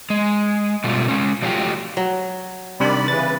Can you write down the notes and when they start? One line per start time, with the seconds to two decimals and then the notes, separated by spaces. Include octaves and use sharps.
0.10 G#3
0.84 B2 G3 A3 F4
1.08 G#3 C#4
1.42 F3 F#3 A3 F4 G4
1.97 F#3
2.80 C3 D#3 G3 D4 D5 B5
3.08 C#3 E3 B4 A6